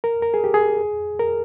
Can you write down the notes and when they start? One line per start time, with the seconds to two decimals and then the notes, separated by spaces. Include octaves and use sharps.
0.04 A#4
0.22 A#4
0.34 G#4
0.44 G4
0.54 G#4
1.19 A#4